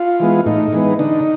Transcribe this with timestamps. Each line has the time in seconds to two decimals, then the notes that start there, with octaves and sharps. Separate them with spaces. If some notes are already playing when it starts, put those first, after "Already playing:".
Already playing: F4
0.20 E3 G#3 B3
0.46 A2 D#4
0.73 E3 G#3 B3
0.99 D3 D#4